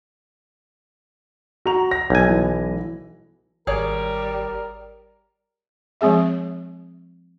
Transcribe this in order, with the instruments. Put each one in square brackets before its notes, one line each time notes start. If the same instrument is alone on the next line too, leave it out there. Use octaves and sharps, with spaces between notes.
[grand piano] F#4 A#5 F7
A#6
[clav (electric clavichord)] B1 G#5
[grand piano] E3
[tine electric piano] G#1 [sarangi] G3 [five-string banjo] G#4 C#5 D5 [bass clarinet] A#4
[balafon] F3 G#3 C4 G#4 E5